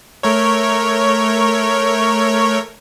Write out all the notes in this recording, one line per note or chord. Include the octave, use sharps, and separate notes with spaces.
A3 A#4 C#5